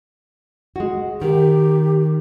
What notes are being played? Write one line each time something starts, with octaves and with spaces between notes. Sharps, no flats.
G#3 F#4
D#3 G4